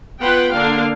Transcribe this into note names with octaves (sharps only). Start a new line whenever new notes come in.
B3 F4 B4 F#5 G5
D3 A#3 D4 F5